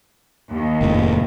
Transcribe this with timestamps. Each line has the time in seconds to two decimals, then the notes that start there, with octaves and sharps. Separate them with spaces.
0.52 D#2
0.81 F1 A2